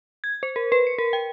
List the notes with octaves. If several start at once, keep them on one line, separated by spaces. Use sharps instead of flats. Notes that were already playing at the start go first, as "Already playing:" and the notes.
G#6
C5
A#4
B4
C#7
A#4
G5